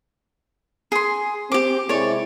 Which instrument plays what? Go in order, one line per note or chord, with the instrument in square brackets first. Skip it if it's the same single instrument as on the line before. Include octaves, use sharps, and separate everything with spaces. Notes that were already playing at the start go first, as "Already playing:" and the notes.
[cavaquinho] G#4 C6
[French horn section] C4 [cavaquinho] G4 D6
[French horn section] C3 G#3 E4 [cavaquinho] C#5 D5